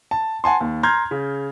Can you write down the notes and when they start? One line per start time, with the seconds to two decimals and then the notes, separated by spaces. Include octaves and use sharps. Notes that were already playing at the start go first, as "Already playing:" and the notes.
0.11 A5
0.44 F#5 G#5 A5 C6
0.61 D#2
0.83 A#5 C6 F6 G6 G#6
1.11 C#3